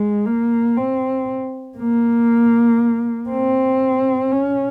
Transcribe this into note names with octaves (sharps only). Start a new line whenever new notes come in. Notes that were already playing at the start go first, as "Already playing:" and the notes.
Already playing: G#3
A#3
C4
A#3
C4
C#4